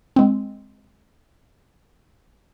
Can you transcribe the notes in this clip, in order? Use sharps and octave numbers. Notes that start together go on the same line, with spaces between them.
G#3 C4